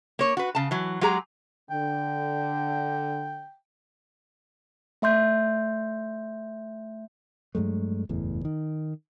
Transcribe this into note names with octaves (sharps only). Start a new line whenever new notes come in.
A#3 C#5
F#4 B4
C#3 A5
E3 F#3
F#3 G#3 G4 G#4 A#5
D3 G5
A3 E5 C6 G6
G2 F#3 G#3 A3
F#1 E2 A2
D#3